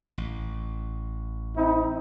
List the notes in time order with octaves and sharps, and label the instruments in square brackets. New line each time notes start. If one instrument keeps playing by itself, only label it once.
[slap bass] A1
[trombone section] C4 D#4 E4